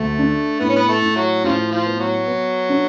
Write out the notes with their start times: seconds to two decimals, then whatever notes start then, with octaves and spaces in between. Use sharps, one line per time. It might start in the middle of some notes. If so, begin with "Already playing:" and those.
Already playing: D2 A3
0.19 D4
0.60 A2 B3
0.69 C#4
0.76 B3
0.88 A3
1.02 A2
1.16 F#3
1.44 A2 C#3 F3
1.71 F3
1.86 B3
2.00 F#3
2.27 B3
2.69 D4